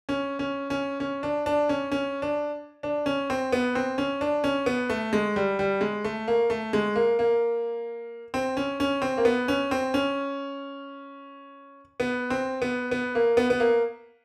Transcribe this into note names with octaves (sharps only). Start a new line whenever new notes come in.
C#4
C#4
C#4
C#4
D4
D4
C#4
C#4
D4
D4
C#4
C4
B3
C4
C#4
D4
C#4
B3
A3
G#3
G3
G3
G#3
A3
A#3
A3
G#3
A#3
A#3
C4
C#4
C#4
C4
A#3
B3
C#4
C4
C#4
B3
C4
B3
B3
A#3
B3
B3
A#3